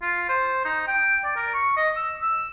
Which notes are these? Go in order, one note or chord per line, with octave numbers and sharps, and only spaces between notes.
F4
C5
D#4
G5
D5
A#4
C#6
D#5
E6
E6